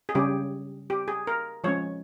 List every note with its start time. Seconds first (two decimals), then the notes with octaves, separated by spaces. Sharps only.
0.09 G#4
0.15 C#3 G3 C#4 G4
0.90 G4
1.08 G#4
1.27 A#4
1.64 F3 G#3 C#4 C#5